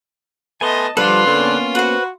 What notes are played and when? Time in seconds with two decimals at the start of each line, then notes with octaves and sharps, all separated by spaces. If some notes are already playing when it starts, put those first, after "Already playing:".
0.61 A3 B3 D#5 G#5 A5 C6
0.97 D3 F3 G3 D4 F4 A4 B4 C6
1.25 F2 A#2 D3 A#3 B3 C#4
1.75 F#4 B4 C5